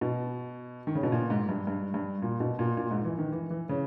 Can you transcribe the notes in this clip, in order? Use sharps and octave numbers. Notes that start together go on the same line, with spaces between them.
B2
D#3
C#3
B2
A#2
G#2
G2
G2
G2
A#2
B2
A#2
A#2
G#2
E3
D#3
E3
E3
C#3